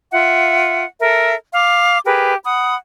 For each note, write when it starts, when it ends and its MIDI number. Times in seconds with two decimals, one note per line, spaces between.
0.12 0.84 65
0.12 0.84 76
0.12 0.84 78
1.00 1.35 69
1.00 1.35 70
1.00 1.35 76
1.53 1.99 77
1.53 1.99 86
2.06 2.34 67
2.06 2.34 68
2.06 2.34 70
2.06 2.34 71
2.44 2.74 78
2.44 2.74 83
2.44 2.74 87